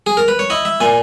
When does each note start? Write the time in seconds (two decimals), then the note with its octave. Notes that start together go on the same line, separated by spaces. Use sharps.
0.06 G#4
0.17 A#4
0.28 B4
0.39 C#5
0.50 E4 D#5
0.65 E5
0.80 A#2 G#5